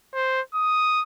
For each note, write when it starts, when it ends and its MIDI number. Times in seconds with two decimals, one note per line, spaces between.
0.15 0.41 72
0.54 1.03 87